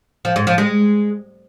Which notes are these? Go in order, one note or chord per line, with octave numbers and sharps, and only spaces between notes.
F3
G#2
F3
G#3